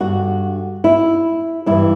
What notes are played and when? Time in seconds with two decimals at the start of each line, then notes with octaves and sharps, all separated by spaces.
0.01 G2 D3 F#4
0.84 E4
1.66 G2 E3 E4